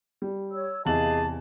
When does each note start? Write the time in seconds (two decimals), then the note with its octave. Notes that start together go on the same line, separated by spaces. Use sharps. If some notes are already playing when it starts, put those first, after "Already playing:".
0.22 G3
0.51 C#5 E6
0.86 E2 C3 G#4 D#5 F5 A5 F#7